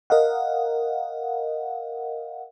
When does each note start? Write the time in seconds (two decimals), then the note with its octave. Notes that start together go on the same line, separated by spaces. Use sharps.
0.10 A#4 D#5 F5 F#5